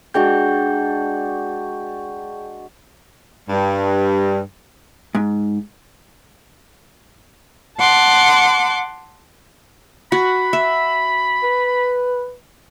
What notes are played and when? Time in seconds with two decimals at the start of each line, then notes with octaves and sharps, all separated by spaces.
0.14 G#3 D4 F#4 G#4 G5 G6
3.50 G2
5.15 G#2
7.79 F#5 A5 C6 D6
10.12 F#4 B5
10.53 E5
11.43 B4